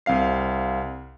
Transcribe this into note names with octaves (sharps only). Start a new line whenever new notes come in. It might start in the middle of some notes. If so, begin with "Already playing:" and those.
C2 C4 F5 C7